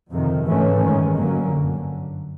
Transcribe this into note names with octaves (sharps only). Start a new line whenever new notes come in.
F2 C3 D#3
G#2 E3 A3 C#4
G#1 G2 D#3 G#3 C#4
G2 D3 F#3 A#3 C#4
G1 F#2 D3